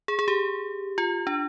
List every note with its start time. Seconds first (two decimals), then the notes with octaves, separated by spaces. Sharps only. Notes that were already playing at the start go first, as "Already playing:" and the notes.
0.08 G#4
0.19 G#4
0.28 G4
0.98 F4
1.27 D4